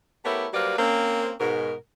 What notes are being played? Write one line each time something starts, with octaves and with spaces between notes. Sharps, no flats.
A3 B3 E4 G4 A#4 C#5
F#3 G3 A#3 B4 C5 D5
A#3 C4 C#4
G#2 B2 A#4